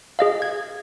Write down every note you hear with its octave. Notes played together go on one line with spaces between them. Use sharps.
G#4 D#5 F5
G#6